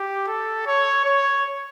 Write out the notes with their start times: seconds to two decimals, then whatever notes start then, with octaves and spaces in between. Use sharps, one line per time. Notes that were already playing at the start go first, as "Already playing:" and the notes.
Already playing: G4
0.28 A4
0.66 C#5
1.05 C#5